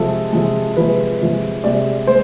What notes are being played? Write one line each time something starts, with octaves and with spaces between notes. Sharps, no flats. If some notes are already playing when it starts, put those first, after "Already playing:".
Already playing: C3 F3 G#3 A4
C3 F3 G#3
C3 F3 G#3 B4
C3 F3 G#3
C3 G#3 D5
G#3 C5